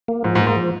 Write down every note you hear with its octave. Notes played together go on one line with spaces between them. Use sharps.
A#3
G#2 F3
G#2
A#3
G#2
F3